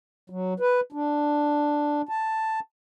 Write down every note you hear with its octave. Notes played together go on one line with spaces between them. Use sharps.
F#3
B4
D4
A5